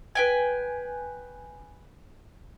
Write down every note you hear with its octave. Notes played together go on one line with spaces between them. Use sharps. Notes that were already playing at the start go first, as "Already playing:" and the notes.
B4 G5 G#5